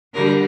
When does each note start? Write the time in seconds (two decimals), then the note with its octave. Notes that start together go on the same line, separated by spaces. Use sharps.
0.14 D3 G3 A#4